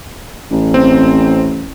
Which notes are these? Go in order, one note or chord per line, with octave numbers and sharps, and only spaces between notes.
A1
C4